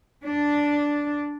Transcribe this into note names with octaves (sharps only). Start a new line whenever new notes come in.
D4